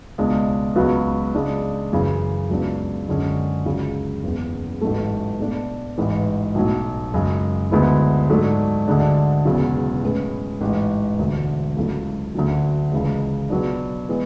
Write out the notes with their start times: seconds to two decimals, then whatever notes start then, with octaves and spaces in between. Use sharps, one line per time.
0.18 C#2 B2 G#3 D4
0.76 C#2 C#3 F#3 B3 F#4
1.35 C#3 G#3 D4
1.93 F#2 C#3 E3
2.50 C#2 C#3 F#3 B3 D4
3.08 F#2 D3 G#3 C#4
3.66 C#2 C#3 F#3
4.24 F#1 E2 C#3
4.81 A1 G#2 F#3 A3
5.39 B2 A3 D4
5.98 A1 G#2 E3
6.55 B1 A2 F#3
7.14 F#2 C#3 G#3
7.71 D2 D3 G#3 B3 E4
8.29 G#2 F#3 A3 D4
8.88 D2 D3 G#3 D4
9.45 E1 E2 C#3 F#3
10.03 A2 G#3 C#4 G#4 B4
10.61 A1 G#2 G#3
11.19 E1 D2 D3
11.77 C#2 C#3 F#3 A3 E4
12.35 D2 D3 F#3 C#4
12.92 C#2 C#3 E3 G#3
13.50 B2 F#3 B3 D4
14.09 E3 G#3 B3